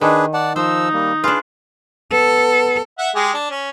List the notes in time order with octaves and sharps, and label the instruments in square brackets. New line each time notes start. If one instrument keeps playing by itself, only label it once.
[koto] D#3 [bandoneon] D4 G#4 B4
[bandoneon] D5 F#5 A5
[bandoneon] F3 E6 [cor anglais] D#4 [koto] C5
[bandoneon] G3 A#3
[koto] D4 F4 [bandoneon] G#4 B4
[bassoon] B3 [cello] A4
[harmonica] E5 F#5
G#3 G4 G#4
D4
C#4